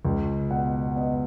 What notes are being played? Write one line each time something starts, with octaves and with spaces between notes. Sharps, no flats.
C#2
B2 F#5
B3 D#5